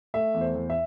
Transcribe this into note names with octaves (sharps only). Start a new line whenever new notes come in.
A3 E5
E2
C5
E2
E5